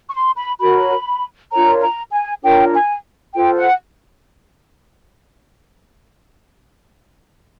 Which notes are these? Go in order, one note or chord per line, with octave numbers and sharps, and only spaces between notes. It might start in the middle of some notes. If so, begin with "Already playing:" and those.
C#6
C6
B5
F#4 A#4 C#5 B5
D4 F4 A#4 C#5 A#5
A#5
G#5
D4 F4 A#4 C#5 G5
G#5
F4 A4 C5 G5
F#5